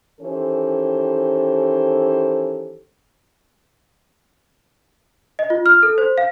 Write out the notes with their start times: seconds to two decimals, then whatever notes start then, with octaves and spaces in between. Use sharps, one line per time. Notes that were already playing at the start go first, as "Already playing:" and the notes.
0.20 D#3 E3 C#4 G4 A4 C5
5.39 D#5
5.50 F4
5.66 F6
5.83 A4
5.98 C5
6.18 F5